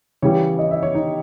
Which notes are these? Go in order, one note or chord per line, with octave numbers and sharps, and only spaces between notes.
C#3 E3 G3 C#5
D#5
E5
C#5
D#4